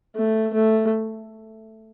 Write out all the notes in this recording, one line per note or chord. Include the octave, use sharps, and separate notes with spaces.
A3
A3